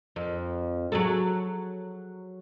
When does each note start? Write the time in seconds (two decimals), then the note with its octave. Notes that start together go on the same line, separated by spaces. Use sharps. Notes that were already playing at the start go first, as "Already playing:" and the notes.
0.16 F2
0.92 F#3 G#4 A4